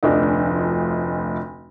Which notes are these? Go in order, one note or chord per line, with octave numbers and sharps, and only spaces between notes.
F1 D2 F3 D4 D#5